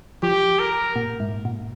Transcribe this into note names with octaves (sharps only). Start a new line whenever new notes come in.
F3 G4
A#4
A#2
G#2
A#2